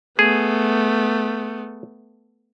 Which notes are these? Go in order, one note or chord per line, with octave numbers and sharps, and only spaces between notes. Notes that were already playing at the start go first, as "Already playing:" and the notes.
A3 B3 G#4